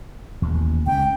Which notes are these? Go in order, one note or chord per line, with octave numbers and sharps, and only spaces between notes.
A1 D#2
C#2 G#3 C#4 G5